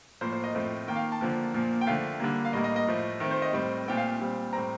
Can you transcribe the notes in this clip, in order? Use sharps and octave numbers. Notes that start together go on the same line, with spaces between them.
A2 F3 A#3 C5
C5
D#5
A2 F3 A3 C4
D#3 A#3 G5
F5
A5
D3 F3 A#3
A#2 F3 A#3
G5
D3 F3 A3 F5
D3 G3 A#3
F5
A2 G3 A#3 D#5
D#5
D#5
A2 F3 A3
D#3 A3 C4
C5
D#5
A2 G3 C4
A#2 A3 C4 G5
F5
A#2 G3 C4
A2 G3 C4 A#5